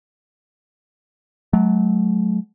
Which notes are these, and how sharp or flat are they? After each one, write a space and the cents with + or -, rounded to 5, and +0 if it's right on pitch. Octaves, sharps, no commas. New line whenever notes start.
F#3 +0 A3 -35